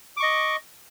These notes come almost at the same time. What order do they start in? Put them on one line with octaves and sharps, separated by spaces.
D6 C#6 D#5